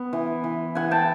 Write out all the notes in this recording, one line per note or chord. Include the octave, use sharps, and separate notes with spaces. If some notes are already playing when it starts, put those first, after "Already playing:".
Already playing: B3
E3
E3
E3 F#5 G#5
G5 A5